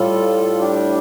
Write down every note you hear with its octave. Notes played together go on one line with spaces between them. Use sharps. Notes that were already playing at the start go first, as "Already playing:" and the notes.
Already playing: A2 G3 F4 A4
D4 G4